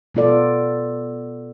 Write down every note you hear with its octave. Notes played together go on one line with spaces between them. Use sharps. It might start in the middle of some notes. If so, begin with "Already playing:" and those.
B2 B3 F4 A4 D5